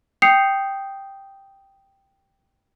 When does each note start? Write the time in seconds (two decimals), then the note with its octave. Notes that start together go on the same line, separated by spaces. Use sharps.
0.22 G5 D#6 G6 C7 C#7 F7